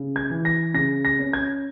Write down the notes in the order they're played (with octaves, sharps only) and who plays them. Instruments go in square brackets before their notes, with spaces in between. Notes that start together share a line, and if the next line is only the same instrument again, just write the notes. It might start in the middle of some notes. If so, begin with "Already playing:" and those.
Already playing: [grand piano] C#3
G#6
E3
A#6
C#3 A#6
A#6
C#4
G#6